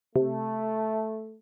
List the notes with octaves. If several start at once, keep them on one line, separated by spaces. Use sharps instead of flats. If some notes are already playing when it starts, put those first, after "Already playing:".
C3 A3